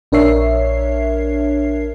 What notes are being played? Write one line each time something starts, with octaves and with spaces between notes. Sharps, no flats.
A#1 D4 A#4 C#5 E5 C7